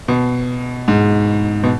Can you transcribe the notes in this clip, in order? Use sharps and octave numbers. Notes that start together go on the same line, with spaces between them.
B2
G#2
B2